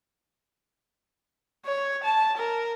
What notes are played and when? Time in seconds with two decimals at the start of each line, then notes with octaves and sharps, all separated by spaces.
1.66 C#5
2.04 A5
2.38 A#4